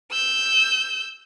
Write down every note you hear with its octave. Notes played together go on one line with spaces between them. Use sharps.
E6 G6